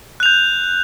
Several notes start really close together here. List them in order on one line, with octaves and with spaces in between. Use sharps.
F#6 F7 G6